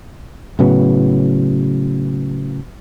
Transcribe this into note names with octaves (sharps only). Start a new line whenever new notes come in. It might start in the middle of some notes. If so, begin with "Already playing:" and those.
A2 C#3 F#3 B3